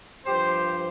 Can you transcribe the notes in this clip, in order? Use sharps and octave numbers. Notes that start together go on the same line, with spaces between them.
G2 F3 G4 C5